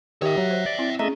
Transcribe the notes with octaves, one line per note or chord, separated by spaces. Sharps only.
D#3 G4 C#5 E5
F#3
C5
D5
C4 E4
A3 C#4 G#4 D#5 E5 A#5